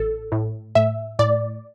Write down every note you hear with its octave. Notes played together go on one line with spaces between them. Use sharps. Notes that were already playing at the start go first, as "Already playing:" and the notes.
Already playing: A1 A4
A2
A2 E5
A2 D5